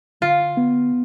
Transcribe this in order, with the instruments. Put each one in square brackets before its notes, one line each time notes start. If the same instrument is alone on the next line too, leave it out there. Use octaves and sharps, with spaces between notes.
[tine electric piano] D3 [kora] F4
[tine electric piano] B3